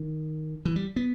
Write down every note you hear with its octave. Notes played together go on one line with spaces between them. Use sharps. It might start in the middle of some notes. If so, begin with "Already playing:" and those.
Already playing: D#3
E3
G3
B3